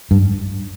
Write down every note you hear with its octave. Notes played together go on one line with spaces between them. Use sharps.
G2